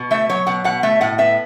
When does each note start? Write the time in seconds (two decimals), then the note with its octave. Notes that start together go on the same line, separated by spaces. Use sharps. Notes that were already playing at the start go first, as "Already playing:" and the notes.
Already playing: B2
0.11 A3 E5
0.29 F#3 C#5
0.47 B2 F#5
0.64 B2 F#5
0.83 A3 E5
1.01 A2 F#5
1.18 B3 E5